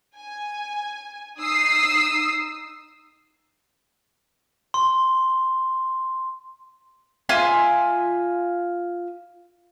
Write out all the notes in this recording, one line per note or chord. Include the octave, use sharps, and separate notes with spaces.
G#5
D#4 D#6 E6 C7
C6
F4 E5 G#5 C6